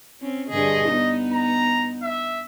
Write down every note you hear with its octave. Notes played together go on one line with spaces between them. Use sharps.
C4 C#4
G2 D3 G#4 D#5
B3 D#4
A#5
E5